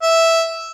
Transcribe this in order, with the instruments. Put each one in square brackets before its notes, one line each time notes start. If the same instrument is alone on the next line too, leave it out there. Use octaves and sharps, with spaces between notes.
[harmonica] E5